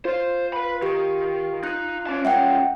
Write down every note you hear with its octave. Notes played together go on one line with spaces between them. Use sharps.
F4 C5
B4 B5
D#3 G4
D#4 F#6
C#4 A5
G3 C#4 E5 F#5 G5